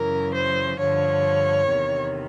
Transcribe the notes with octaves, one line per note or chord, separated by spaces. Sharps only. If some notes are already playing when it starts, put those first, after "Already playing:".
Already playing: F#2 C#3 E3 A#4
C5
G2 D3 F3 C#5
E2 C3 D#3